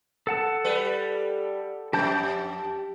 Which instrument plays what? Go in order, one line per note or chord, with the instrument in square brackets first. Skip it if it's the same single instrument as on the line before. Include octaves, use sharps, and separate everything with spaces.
[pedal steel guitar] A4 F#5 A5
[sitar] G3 B4
[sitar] F2 [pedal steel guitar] G4 A5 G6